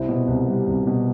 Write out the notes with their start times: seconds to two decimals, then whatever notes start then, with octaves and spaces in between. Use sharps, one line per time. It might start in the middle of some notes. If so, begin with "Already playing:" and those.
Already playing: C2 C4 E4
0.09 B2
0.28 C2
0.48 G3
0.67 C2
0.87 B2